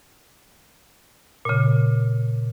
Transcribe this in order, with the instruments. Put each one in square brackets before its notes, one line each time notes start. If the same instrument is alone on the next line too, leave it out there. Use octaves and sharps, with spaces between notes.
[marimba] A#2 C#3